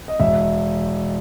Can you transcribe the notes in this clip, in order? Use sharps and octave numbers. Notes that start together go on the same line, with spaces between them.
D#5
E1 E5